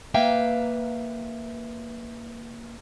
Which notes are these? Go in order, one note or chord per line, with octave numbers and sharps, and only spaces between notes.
A#3 B4 E5 F5 G5 A#5